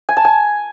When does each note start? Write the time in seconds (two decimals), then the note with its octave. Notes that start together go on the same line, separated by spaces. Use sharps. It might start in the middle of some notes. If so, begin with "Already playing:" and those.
0.09 G#5
0.17 A5
0.25 G#5